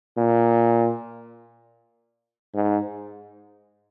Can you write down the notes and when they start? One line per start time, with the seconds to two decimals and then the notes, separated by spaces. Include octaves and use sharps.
0.18 A#2
2.54 G#2